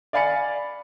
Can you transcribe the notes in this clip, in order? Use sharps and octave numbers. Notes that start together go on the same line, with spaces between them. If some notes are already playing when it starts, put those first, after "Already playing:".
D5 F5 G#5 B5 A6 C#7